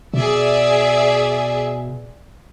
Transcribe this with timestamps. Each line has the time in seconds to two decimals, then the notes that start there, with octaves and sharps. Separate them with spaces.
0.13 B2 G#4 D5 E5